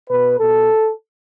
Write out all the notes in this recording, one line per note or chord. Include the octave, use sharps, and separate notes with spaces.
B2 B4
B2 A4